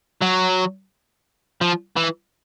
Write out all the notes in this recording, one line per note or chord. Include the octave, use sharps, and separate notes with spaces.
F#3
F3
E3